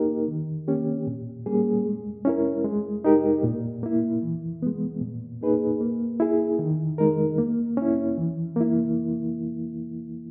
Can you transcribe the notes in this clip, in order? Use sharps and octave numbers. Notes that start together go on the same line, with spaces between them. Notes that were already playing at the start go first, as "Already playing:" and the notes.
Already playing: A#3 D#4 G4 A#4
D#3
A#3 C#4 G4
A#2
G3 A#3 C#4 G#4
G#3
C#4 E4 A#4
G#3
D#4 G4 A#4
A#2
A#3 E4
E3
G#3 B3
A#2
A#3 D#4 G#4 B4
A#3
E4 G#4
D#3
G#3 D#4 A#4
A#3
C#4 E4
E3
A#3 E4